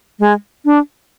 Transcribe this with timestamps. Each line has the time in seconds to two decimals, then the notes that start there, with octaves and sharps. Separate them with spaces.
0.20 G#3
0.65 D4